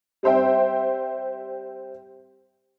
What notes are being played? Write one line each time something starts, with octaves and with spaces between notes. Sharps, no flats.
G3 C4 C5 E5 G5